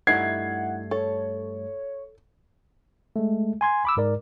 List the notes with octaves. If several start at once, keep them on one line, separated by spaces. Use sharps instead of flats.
G2 G3 A3 D#4 E4 F#5 G#6 C7
A4 C#5
G#3 A3
G#5 C6 G#6
B5 D6 E6
G#2 A#4 D5